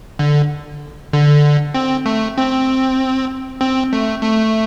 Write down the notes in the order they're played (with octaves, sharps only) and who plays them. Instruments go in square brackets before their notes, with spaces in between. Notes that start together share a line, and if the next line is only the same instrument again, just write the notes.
[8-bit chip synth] D3
D3
C4
A3
C4
C4
A3
A3